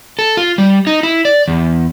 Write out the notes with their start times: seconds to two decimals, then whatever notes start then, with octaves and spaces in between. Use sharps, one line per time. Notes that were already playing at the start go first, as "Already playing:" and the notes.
0.19 A4
0.37 F4
0.58 G3
0.87 D#4
1.03 E4
1.25 D5
1.48 E2